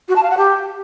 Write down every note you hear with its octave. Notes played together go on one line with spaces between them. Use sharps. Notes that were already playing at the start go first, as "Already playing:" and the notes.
F#4
A5
F5
F#5
G4